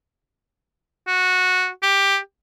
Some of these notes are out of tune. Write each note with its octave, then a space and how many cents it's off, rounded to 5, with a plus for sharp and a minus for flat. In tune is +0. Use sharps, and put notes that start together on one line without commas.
F#4 -10
G4 +10